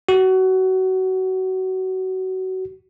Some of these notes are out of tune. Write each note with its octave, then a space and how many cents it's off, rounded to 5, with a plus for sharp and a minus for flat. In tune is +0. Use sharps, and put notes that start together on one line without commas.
F#4 +25